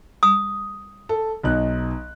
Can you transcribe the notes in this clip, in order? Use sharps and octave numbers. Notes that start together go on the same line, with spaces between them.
D#6
A4
B1 D#4 F#6